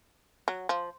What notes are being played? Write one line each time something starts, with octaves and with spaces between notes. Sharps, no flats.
F#3
F3